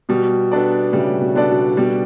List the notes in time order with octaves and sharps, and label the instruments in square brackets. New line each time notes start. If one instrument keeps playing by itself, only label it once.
[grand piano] B2 [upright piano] G3
[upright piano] B3 D4 A4 D5
[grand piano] A2 C#3 [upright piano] G3
[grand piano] B2
[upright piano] B3 D4 A4 D5
[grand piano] B2
[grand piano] B2 [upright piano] G3